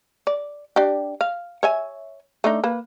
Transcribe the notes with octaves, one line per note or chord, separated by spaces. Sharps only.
D5
D4 G4
F5
C#5 E5 G#5
A3 D4 D#4
A#3 B4